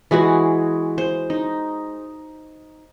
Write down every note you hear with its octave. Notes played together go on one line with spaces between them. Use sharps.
E3 G#3 F#4 G#4
C5
D#4